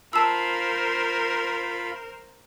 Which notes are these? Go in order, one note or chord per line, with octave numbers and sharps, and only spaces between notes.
F4 A#4 C5 F5 A5 B5 E6